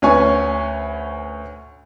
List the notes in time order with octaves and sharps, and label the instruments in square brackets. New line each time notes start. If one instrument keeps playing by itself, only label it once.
[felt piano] D2 C#4 B4 G#5 C#6